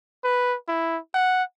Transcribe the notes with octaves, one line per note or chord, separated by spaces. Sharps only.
B4
E4
F#5